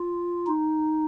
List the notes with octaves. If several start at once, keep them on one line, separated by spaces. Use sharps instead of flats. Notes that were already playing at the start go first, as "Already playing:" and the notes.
Already playing: F4
D#4